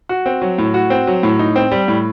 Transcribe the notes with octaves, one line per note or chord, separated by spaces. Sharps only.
F#4
C4
F#3
A2
F#4
C4
F#3
A2
D#4
C4
G3
A2